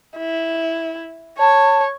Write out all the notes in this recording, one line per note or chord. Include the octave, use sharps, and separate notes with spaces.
E4
C#5 A5